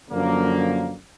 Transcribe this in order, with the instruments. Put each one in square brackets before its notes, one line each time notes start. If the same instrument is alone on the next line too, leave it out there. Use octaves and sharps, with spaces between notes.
[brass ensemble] F#2 D3 F3 A#3